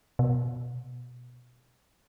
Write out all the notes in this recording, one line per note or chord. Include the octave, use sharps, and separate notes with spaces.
B2